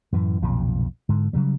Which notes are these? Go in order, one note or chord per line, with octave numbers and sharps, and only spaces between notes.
F#2 A2 E3
B1 F2 A#2 C#3
G#2 D3
C#3 F#3 G3